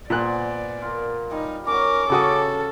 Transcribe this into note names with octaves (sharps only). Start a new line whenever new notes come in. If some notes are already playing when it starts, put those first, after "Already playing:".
A#2 B3 C5 D5 G#5 F#6
F4 A#4
G3 D#4
C#4 F#4 A#4 D6
C#3 C#4 F#4 G4 A4 D#6